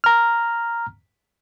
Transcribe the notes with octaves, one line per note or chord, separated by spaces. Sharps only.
A#5 F6